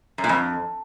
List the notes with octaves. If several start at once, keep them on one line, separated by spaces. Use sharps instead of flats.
F#2
A#2
F2